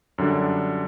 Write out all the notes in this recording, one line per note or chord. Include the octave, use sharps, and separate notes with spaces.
F#2 D3 G3 D4